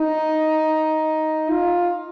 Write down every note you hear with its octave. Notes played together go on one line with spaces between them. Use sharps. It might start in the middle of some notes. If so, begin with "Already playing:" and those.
Already playing: D#4
F4